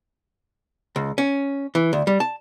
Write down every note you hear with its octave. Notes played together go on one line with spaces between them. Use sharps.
C#2
C#4
E3
D2
G3
A5